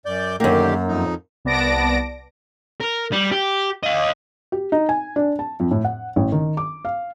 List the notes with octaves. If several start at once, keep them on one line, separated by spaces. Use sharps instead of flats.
F#2 D5 G6
F#2 D3 D#3 A#3 G4
F2 D#4
C2 B3 D5 A5 A#6 D7
A#4
G3
G4
D#5 F5
G4
D#4
G#5
D4
A5
F2
A2
F#5
A1
D#3
D6
F5